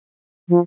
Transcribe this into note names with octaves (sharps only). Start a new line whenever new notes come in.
F3